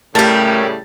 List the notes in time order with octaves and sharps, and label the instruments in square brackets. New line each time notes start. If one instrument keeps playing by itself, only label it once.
[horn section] A2 C#3 G3 [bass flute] A3 [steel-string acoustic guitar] G4 A#4 [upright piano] A5 A6